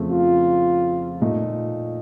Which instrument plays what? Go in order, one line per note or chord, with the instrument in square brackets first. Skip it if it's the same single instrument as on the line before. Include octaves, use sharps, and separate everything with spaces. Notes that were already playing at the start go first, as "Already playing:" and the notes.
Already playing: [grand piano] F2 C#3 A3
[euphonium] F4
[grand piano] A#2 A3 D#4